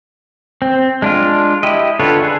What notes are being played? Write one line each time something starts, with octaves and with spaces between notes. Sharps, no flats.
C4
G#3 D4 F4
E4 G4 D#5
D3 F4 A4 B4 C#5
D4 G#4 B4